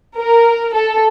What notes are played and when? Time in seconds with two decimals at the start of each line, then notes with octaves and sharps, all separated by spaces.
0.18 A#4
0.74 A4